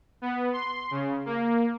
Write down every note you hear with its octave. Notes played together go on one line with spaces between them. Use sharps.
B3
C6
C#3
A#3